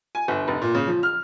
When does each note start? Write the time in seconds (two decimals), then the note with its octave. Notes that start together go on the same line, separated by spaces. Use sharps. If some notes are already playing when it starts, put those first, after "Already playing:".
0.15 G#5
0.28 G1
0.48 F1
0.62 A#2
0.75 C#3
0.88 F3
1.03 F6